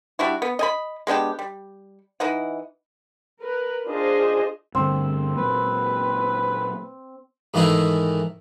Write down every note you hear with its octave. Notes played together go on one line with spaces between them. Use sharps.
G3 D4 E4 F#4
B3
D#5 G#5 B5
G#3 B3 D4 G4
G3
E3 D#4 D#5 F#5
A#4 B4
D4 F4 G#4 C5 D#5
G2 D3 A3 C4
A#2 F#3 A#3 B4
G#2 D#3 E3 A3 D#4 E4